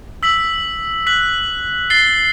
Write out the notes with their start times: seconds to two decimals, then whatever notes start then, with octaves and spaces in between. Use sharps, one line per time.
0.23 E6 B6 F#7
1.07 F#6 B6 F#7
1.90 A6 C7 G7